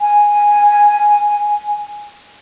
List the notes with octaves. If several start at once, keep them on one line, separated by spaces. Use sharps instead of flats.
G#5